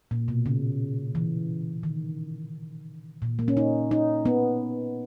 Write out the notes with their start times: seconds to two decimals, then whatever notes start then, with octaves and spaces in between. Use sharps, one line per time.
0.11 A#2
0.28 B2
0.46 C#3
1.15 E3
1.83 D#3
3.22 A#2
3.39 A#3
3.48 C#4
3.57 D#4
3.91 D#4
4.25 B3